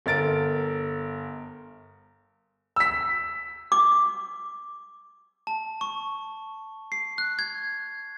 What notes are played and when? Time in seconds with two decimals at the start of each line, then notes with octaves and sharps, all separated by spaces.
0.06 G1 A#4 A6 D7
2.76 E6 B6
3.72 D6
5.47 A5
5.81 C#6
6.92 C7
7.18 F#6
7.39 G#6